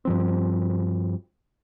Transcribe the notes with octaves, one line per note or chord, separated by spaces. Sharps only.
G2 F3 C4